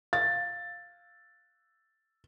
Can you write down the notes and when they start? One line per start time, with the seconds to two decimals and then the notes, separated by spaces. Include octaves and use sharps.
0.13 F5 A6